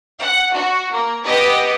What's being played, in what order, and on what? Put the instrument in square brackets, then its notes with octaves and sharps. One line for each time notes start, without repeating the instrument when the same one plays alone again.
[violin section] F#5
F#4
A#3
B3 G4 B4 D#5